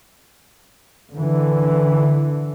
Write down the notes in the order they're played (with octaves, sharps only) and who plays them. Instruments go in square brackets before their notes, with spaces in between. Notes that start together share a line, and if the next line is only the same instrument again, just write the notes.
[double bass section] D3 E3